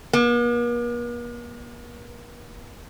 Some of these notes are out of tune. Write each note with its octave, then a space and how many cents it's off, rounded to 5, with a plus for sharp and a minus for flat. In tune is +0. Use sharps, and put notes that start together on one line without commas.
A#3 +45